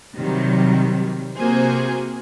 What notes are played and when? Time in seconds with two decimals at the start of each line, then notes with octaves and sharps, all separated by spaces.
0.19 C3 D#3 F#3 G3
1.36 C3 A#3 F#4 G#4 C5